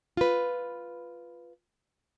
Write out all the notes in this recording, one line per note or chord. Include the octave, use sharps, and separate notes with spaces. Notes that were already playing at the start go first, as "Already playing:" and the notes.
F4 B4